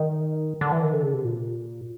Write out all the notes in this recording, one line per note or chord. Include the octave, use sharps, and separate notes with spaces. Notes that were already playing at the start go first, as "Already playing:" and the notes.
Already playing: D#3
D3
E3
D#3
D3
C#3
C3
A#2